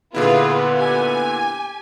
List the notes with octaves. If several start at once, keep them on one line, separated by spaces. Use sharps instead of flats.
A#2 D3 B3 E4 F4 G#4 B4
G4 G#5